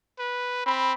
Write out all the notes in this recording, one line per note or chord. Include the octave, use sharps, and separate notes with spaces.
B4
C4 B5